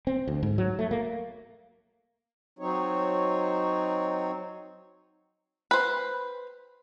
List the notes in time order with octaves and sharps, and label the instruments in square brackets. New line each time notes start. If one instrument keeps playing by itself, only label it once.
[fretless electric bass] C4
D2
G#2
F#3
A3
A#3
[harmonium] F#3 C4 D#4 C#5
[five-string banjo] B4 C5